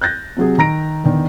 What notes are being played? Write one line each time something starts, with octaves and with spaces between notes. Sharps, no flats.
F#6 G6 A6 A#6
C3 F#3 G#4
D#3 A#5 A#6 D7
E2 D3 D#3